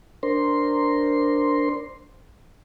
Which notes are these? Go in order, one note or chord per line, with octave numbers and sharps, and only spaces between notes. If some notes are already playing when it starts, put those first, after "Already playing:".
D4 A#4 C5 C6